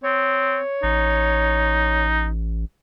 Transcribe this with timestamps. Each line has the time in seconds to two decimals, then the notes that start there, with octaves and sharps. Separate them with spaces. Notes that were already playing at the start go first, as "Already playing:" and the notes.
0.04 C4 C#5
0.83 A1 D#4